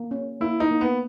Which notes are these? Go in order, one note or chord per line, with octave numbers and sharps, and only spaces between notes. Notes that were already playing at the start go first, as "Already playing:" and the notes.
Already playing: A#3
C#4
A#3 E4
D#4
A#3
B3